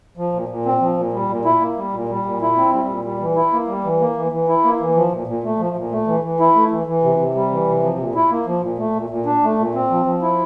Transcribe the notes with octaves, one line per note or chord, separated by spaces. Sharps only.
F3
A#2
A#2
C4
F3
A#2
G3
A#2
E4
A#3
G3
A#2
G3
A#2
E4
C4
G3
A#2
G3
E3
E4
A#3
G3
E3
A#3
E3
E3
E4
A#3
E3
F3
A#2
A#2
A3
F3
A#2
A3
E3
E3
E4
A3
E3
E3
C3
C3
G3
E3
C3
F3
A#2
E4
A#3
F3
A#2
A3
A#2
A#2
D4
A3
A#2
C4
F3
F3
E4